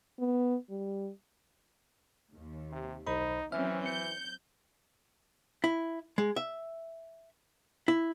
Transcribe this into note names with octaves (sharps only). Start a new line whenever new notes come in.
B3
G3
D#2
C3
B1 D#4 C5 B5
E3 F#3 C4 C#4 E5 F6
G6 C#7
E4
G#3
E5
E4